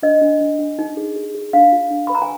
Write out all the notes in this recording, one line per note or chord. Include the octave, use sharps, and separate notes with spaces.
D4 D#5
D4
D4
D4
D#4
G#4
G#4
G#4
D4 F5
F4
D4
B4 B5
A#5
G#5